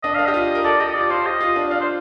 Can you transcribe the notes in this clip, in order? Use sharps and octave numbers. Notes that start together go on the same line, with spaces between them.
D4 D#5
D4 F5
G4 D#5
F4
A#4
A4 D5
G4 D#5
F4 D5
F4 C5
G4 D#5
F4
D4
D4 F5
C5